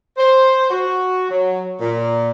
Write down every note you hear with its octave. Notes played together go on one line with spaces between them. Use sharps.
C5
F#4
F#3
A#2